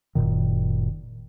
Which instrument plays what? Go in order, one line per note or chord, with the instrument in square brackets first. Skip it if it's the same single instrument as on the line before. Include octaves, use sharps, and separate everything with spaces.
[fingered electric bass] F#1 C2 A#2 D#3